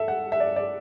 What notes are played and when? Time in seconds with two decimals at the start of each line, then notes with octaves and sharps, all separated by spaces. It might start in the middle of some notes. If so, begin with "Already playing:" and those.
Already playing: A4 E5
0.08 F#5
0.32 E5
0.40 D5
0.56 D5